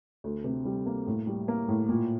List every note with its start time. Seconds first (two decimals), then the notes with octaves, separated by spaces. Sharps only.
0.24 D2
0.44 C3
0.65 G3
0.86 A#3
1.07 A2
1.27 G3
1.48 A#3
1.68 A2
1.89 A#2